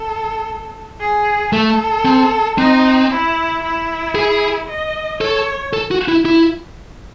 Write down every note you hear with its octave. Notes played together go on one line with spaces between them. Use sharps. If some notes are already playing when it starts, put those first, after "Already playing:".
Already playing: A4
G#4
A3 A4
C4
C4 D#4
E4
E4
G#4
D#5
A4 C#5
A4
F#4
E4
E4